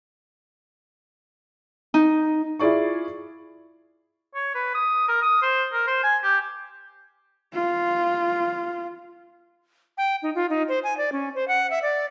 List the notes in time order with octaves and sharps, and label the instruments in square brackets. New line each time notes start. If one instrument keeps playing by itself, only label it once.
[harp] D#4
[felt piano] E4 F4 G#4 D5 C#6
[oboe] C#5
B4
D#6
A#4
D#6
C5
A#4
C5
G#5
G4
[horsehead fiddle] F4
[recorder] G5
D#4
F4
D#4
C5
G#5
D5
C#4
C5
F#5
E5
D5